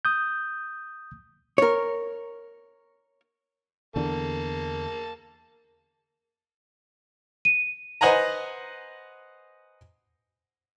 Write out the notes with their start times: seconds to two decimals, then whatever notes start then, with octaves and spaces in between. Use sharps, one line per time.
0.05 D#6 G6
1.58 A#4 C#5
3.96 E2 D3 A#3 A5
7.45 D#7
8.01 B4 C5 D#5 F#5 G#5 A#5